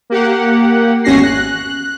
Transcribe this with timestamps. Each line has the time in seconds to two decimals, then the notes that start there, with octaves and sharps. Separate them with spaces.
0.10 A#3 G4 F#5
1.04 G#1 E2 C#4 F#4 A#6 C7
1.23 F#6